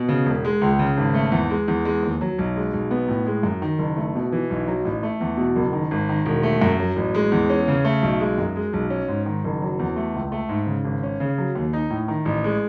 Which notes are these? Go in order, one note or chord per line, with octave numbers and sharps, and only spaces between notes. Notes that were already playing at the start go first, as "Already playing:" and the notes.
Already playing: B2
C#3
E1
G#3
C#2
C#3
G#1
A3
E2
G#3
E2
G#3
D#2
F#3
B1
G#3
B1
B3
A2
G#3
F#2
D#3
F#1
A3
B2
E3
B1
F#3
A1
A3
E2
B2
F#1
D#3
G#1
D#3
E1
A3
F#2
F#3
A1
G#3
E2
C#4
C#3
A3
B1
G#3
F#2
G#3
B1
C#4
G#2
D#3
F#1
F#3
E2
A3
C#2
A3
G#2
C#3
G#1
C#4
C#3
F#3
D#2
D#4
A2
D#3
A1
G#3